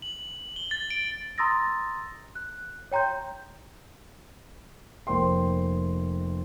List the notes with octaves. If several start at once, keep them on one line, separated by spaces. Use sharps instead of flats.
F#7
G7
A6
D7
A#5 C6 D#6 E6 A6 A#6
F#6
C#5 G5 A#5 C6 G6
F1 A#3 C5 G5 C6